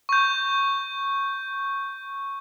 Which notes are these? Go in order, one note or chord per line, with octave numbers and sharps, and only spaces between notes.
C#6 G6